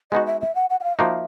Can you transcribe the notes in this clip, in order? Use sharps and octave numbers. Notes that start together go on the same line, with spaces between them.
G#3 B3 D#4 F#4 D#5
E5
E5
F#5
F#5
F#5
F5
F3 A#3 D#4 F#4 E5